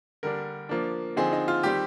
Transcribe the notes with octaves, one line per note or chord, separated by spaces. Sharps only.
D3 G3 D4 A#4
F3 A#3 D4
D3 F3 C4 D#4 G#4
D#4
F4
D#3 G3 C4 G4